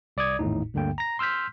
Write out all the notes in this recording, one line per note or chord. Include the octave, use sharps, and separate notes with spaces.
C2 D5 D6 D#6 G#6
G#1 E2 A2 D#4
D2 G2 D3 A#3 G5
A#5 A#6
C6 E6 F6 G6 B6